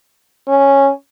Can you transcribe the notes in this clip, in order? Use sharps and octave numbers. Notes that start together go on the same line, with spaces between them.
C#4